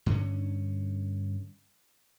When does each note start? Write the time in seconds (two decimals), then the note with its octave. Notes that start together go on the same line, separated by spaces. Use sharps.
0.06 G2 D3 C#4